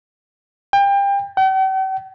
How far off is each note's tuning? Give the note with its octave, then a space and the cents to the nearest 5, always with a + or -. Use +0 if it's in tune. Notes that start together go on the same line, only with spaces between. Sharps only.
G5 +30
G5 -45